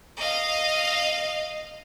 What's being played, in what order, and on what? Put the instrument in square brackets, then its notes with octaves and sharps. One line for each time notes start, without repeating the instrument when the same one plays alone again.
[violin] D#5 F5